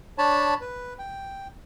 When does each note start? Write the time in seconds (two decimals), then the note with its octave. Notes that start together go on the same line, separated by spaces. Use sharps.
0.18 D4 C#5 A5 B5
0.61 B4
0.99 G5